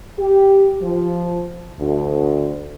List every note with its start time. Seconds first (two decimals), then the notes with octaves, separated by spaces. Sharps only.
0.20 G4
0.82 F3
1.79 D2